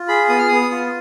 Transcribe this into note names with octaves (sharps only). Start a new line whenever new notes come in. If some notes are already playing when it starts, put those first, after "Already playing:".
Already playing: F4
G#4 B5
B3 D#6
F6
B3 D#6
F4